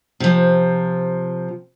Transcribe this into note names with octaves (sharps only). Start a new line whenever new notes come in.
C3 F3